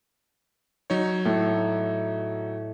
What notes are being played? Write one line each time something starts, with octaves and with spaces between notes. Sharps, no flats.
F#3 D#4 C#5
A2